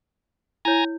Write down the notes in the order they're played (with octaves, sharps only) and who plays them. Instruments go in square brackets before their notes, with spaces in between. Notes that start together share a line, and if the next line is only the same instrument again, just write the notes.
[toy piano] E4 C#5 [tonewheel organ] G#5 A#5